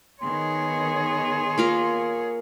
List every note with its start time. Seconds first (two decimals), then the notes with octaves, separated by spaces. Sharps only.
0.22 D#3 B3 G#4 C#5 C6
1.58 A#3 F4 A#4